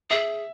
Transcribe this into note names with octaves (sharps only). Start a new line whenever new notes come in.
G#4 E5